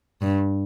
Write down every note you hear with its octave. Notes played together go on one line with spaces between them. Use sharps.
G2